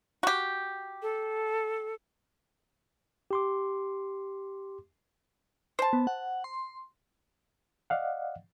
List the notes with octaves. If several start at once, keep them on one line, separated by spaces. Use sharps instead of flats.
F#4 G4
A4
G4 C6 D6
C5 A5
B3
F#5
C6
D5 D#5 F5 F#5